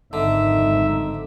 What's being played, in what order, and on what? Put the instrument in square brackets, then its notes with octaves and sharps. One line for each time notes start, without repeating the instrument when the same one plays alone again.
[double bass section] G#1 F2 [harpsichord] D3 [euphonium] D#4 [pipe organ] E5